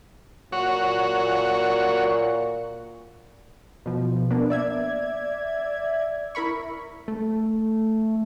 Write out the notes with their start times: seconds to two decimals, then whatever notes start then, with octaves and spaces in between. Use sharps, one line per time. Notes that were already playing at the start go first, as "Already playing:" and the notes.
0.52 A#2 F#4 C#5
3.86 B2 F3
4.31 A#3 B3 D4
4.50 D5 E5 G#6
6.35 E4 A#4 B5 C#6
7.08 A3